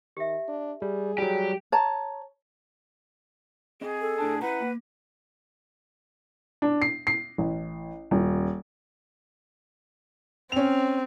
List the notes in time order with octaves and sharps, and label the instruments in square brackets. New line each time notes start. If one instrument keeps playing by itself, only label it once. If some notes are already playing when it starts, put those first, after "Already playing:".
[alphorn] D#3 [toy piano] G4 E5
[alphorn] D4
[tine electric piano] G3 [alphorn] G#4
[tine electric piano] F#3 G3 [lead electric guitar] G4
[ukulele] C#5 A5 A#5
[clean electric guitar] C4 D#5 [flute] G#4
[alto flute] A4
[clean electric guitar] A2 D4 A5
[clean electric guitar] E4 A#5 [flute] B4 [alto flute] F#5
[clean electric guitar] A#3
[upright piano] D4
C7
C7
A1
D#1
[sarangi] C4 [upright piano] C#4 F7